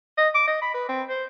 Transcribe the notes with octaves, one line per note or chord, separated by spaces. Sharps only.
D#5
D6
D#5
B5
B4
C4
C5